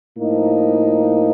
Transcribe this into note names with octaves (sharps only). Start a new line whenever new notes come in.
A2 F3 A#3 D#4